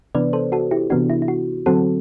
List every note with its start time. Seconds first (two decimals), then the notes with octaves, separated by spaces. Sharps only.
0.15 C3 E3 B3 D4 B4 D5
0.33 A4 C5
0.52 F#4 A4
0.71 E4 G4
0.90 C3 E3 B3 D4 F#4
1.10 E4
1.22 E4
1.28 F#4
1.66 D3 F#3 C4 F#4 A4